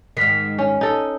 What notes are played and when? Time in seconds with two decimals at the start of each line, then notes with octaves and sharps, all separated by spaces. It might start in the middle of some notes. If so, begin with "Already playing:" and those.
0.17 G#2 D#3 F6 B6 C7
0.58 C#4
0.81 D#4 A4